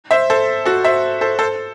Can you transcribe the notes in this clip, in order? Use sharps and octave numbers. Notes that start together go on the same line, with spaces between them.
C5 E5
A4 C5
F#4 A4
C5 E5
A4 C5
A4 C5